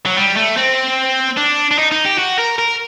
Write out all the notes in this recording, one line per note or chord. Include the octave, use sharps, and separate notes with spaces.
F#3
G3
A3
C4
D4
D4
D#4
D#4
G4
F#4
A#4
A#4